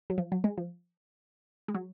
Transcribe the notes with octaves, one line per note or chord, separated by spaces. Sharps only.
F#3
F3
F#3
G#3
F3
G#3
F#3